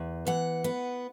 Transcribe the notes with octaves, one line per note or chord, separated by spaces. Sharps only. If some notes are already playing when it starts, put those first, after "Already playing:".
Already playing: E2
E3 F#5
B3